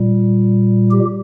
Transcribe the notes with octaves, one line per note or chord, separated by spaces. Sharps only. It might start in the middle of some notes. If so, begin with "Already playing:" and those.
Already playing: A#2 G3
G4